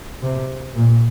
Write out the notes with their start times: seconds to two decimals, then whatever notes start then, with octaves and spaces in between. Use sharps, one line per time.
0.22 C3
0.75 A#2